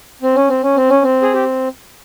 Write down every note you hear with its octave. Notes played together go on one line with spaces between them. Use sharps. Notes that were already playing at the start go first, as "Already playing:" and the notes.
C4
C#4
C4
C#4
C4
C#4
C4
G#4
G4